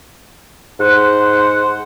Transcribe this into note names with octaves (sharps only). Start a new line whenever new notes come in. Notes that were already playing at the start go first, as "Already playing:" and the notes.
G#2 C5 F#5